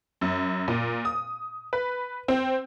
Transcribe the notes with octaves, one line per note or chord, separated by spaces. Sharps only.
F#2
A#2
D#6
B4
C4